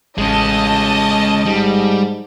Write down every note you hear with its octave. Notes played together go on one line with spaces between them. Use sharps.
A1 G#3 C#4 D#5 A5
G#2 G3